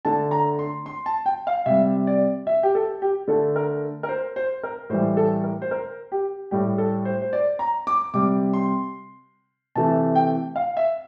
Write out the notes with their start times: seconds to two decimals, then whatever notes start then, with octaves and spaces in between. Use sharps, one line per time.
0.05 D3 A3 A5
0.31 A#5
0.59 C6
0.86 C6
1.06 A5
1.26 G5
1.47 F5
1.66 C3 G3 E5
2.07 D5
2.47 E5
2.63 G4
2.75 A4
3.02 G4
3.28 D3 A3 A4
3.56 A#4
4.03 A#4
4.09 C5
4.36 C5
4.63 A#4
4.90 A2 E3 G3 C5
5.17 A4
5.44 A#4
5.62 C5
5.71 A#4
6.12 G4
6.51 A2 G3 G4
6.78 A4
7.05 C5
7.22 C5
7.33 D5
7.59 A#5
7.87 D6
8.14 C3 G3 D6
8.54 C6
9.75 C3 E3 A3 A5
10.15 G5
10.56 F5
10.77 E5